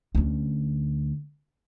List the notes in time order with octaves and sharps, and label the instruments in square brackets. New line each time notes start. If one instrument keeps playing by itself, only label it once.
[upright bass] D2 C#4